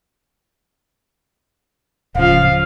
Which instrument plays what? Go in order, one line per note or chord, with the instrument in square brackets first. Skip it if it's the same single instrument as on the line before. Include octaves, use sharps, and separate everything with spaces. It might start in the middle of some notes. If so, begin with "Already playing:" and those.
[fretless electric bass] D1 C#3 [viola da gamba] F3 [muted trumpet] F5